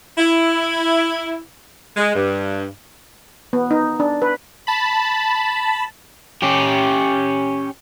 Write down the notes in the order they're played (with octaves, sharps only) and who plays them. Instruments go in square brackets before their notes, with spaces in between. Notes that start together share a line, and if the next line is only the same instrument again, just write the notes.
[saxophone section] E4
G#3
G2
[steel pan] B3
D#4
D4
B4
[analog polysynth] A5 B5
[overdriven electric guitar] C#4 G4